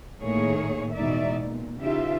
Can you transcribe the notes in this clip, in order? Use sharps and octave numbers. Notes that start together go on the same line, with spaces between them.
A2 D#3 A3 A#3 G#4 C#5
E2 B2 G#3 D#4 D5 E5
A#2
C#3 E3 D#4 F4 G4 E5